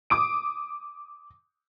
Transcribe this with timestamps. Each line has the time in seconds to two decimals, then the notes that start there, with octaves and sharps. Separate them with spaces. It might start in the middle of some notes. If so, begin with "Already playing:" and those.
0.10 D6 D#6 D7